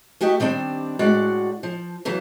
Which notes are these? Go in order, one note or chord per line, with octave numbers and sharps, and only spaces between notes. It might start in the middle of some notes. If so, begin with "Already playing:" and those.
A3 F#4 G4 D#5
D#3 G3 C4 D4
A2 G#3 F#4 D5 F#5
F3
C#3 E3 F#3